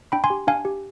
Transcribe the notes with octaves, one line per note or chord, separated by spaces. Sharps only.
D4 G5 B5
G#5 C6
G4
D4 F5 G#5
G4